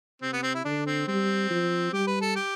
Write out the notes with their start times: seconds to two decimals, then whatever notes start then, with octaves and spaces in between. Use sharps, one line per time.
0.22 C3 C4
0.33 B3
0.43 C4
0.55 E4
0.65 D3 D4
0.86 C4
1.07 G3 C4
1.50 F3
1.93 G3 G4
2.07 B4
2.21 A4
2.36 G4